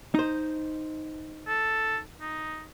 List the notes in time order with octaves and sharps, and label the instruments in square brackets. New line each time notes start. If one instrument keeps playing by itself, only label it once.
[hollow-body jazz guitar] D#4 C5
[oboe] A4
D#4